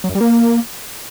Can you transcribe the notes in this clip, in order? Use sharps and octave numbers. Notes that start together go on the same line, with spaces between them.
F#3
F#2
G3
A#3